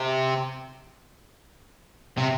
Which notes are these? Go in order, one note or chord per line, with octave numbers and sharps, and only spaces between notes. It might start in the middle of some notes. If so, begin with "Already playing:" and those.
Already playing: C3
C3